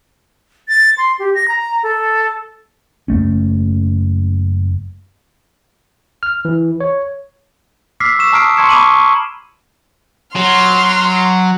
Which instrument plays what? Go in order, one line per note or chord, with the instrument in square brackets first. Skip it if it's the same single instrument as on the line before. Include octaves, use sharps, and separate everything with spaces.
[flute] A6
C6
G4
A#6
A#5
A4
[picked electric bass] F#1 F#2 A3 C#4
[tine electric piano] F6
E3
C#5
[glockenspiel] D6 E6 F6 B6 C7
C#6 E6 E7
A5 A#5 D#6 F6 C7 D7
A5 C6 C#6 G#6 C#7 E7
B5 C#6 D6 D#7 E7 F#7
C#6
[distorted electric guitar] F#3 [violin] C6 F6